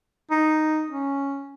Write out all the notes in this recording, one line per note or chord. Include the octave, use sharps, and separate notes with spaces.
D#4
C#4